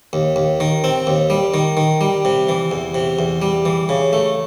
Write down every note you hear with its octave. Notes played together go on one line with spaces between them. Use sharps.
D#2
D#2
D#3
C4
D#2
G3
D#3
D#3
G3
C3
E3
E2
C3
E2
G3
E3
C#3
A3